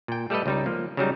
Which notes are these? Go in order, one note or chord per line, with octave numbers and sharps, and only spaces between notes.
A#2 G5
G3 A3 G4 A4 B4 D#5
C#2 G3 D#4
F3 A#3
C#3 F#3 G3 D#4